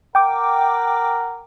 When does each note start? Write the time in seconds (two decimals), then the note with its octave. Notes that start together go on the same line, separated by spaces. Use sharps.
0.15 A#4 F#5 G5 D6